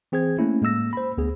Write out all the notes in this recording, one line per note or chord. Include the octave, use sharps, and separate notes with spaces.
E3 C4 G#4 C5 G#6
A3 A#3 C#4 E4
A2 G#3 A#3 E6 A#6
C5 B5
D2 B3 G#4